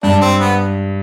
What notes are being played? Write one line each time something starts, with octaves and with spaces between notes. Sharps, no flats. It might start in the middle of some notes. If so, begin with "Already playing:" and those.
G2 D4
C4
B3